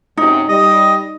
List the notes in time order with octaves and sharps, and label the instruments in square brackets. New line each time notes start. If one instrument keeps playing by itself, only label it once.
[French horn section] F#2 C3 [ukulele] D#4
[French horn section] G3 [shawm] D#5